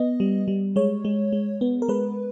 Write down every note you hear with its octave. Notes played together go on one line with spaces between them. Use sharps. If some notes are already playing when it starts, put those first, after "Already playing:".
Already playing: B3 D#5
G3
G3
G#3 C#5
G#3
G#3
B3
A#4
G#3 B4